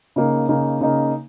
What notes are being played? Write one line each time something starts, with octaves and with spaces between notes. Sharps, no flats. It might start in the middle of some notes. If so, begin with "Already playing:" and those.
C#3 A#3 D#4
C#3 A#3 D#4
C#3 A#3 D#4